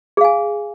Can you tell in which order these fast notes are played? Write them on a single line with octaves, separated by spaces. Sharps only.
G#4 F5 G#5